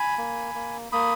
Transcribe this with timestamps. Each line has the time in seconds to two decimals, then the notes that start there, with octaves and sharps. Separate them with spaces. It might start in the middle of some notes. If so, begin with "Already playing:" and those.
Already playing: G#5 B5
0.17 A#3
0.55 A#3
0.92 A#3 B5 D#6